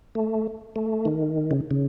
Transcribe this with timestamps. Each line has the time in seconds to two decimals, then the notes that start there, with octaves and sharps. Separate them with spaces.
0.15 A3
0.76 A3
1.05 D#3
1.51 C#3
1.71 C#3